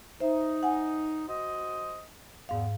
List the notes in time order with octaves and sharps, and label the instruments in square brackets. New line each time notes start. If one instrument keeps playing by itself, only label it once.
[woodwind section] D#4 [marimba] C5 E5
[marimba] F#5 G#5
[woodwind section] F#4 C5 D#5
[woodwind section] E2 [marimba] G#2 F5